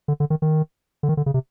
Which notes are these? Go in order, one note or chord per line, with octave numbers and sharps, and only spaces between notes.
D3
D3
D#3
D#3
D3
D#3
D3
C#3
C3